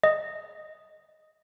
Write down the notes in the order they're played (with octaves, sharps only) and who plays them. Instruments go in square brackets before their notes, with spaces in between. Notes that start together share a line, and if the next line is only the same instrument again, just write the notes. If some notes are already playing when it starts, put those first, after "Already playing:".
[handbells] D#5